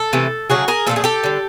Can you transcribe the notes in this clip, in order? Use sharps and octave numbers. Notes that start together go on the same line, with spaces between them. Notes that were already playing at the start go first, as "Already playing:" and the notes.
Already playing: A4
C3 E3 A3
C#3 F#3 A3 F#4 G#4
G#4 A#4
A#2 F3 A3 A4
G#4
G4 A4
D3 G3